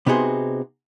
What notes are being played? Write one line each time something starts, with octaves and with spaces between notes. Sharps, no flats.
C3 B3 D#4 F#4 G#4 C5